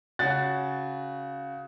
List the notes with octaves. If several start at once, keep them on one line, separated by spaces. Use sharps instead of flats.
C#3 F#4 F#6 A6